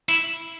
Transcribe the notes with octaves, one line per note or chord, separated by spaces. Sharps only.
E4